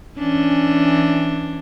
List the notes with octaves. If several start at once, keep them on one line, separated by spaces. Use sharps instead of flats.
E3 C#4 D4